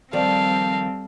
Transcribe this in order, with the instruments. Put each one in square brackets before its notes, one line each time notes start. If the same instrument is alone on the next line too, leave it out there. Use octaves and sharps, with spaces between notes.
[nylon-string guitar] D#3 F3 D5 [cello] G3 C4 [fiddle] A4 F5